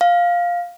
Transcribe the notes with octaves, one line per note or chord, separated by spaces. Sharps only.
F5